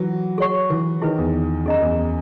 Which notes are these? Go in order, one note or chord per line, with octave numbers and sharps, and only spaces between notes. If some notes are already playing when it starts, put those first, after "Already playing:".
Already playing: E3 F#3 B4
G#4 C#5 F#5 C#6
E3
D#3 E4 G#4 B4
E2
F#2 G#4 D#5 A#5
E2